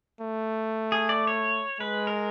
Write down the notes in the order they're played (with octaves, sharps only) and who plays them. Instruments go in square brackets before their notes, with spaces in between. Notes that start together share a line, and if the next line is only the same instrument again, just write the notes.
[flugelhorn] A3
[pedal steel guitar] G#4
D5
C#5
[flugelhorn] G#3 [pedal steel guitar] B4
[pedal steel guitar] A#4